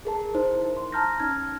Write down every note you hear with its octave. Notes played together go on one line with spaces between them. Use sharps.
G#4 A#4 A5
D#4 E4 A#4 C5
C6
A5 A#5 F6 G6 A#6
C#4 D#4 F6 G#6